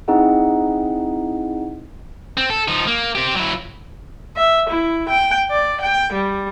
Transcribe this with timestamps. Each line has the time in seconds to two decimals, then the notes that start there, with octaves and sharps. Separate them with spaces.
0.08 C4 D#4 E4 G#4 D#5 F#5
2.37 C4
2.50 A4
2.68 F3 D#4
2.87 A#3
3.15 C4 G4
3.35 F#3 E4
4.36 E5
4.70 E4
5.09 G5
5.51 D5
5.82 G5
6.13 G3